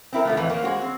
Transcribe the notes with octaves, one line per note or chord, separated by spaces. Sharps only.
C4 E4 A#4
B2 F3 A3
F2 A2 E3
A#3 C#5
G#3 F#4 C5
C4